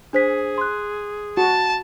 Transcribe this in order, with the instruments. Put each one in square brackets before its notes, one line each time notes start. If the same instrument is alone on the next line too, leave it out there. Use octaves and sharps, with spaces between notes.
[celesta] D4 C5 B6 [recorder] G#4
[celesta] C6 F#6
[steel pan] F#4 [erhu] A5